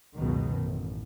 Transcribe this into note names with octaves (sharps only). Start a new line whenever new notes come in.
C#2 F#2 B2 D#3
A1